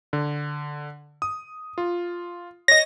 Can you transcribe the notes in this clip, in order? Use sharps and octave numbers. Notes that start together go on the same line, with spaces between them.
D3
D#6
F4
C#5 D#5 A#6